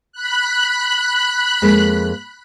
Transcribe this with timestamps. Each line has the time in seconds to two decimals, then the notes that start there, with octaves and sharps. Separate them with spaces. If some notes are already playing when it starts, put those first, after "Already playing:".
0.13 B5 F#6
1.62 F2 G#3 A#3